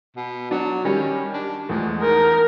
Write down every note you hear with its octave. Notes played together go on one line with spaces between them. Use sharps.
B2
F#3 D4 F#4
D#3 G3 C#4 G4
D4
E2 F3 G#3 A3
D#4 A#4